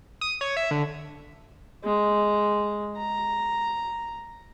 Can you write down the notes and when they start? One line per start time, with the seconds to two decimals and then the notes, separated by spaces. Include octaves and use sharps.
0.21 D#6
0.41 C#5
0.57 E5
0.71 D3
1.84 G#3
2.98 A#5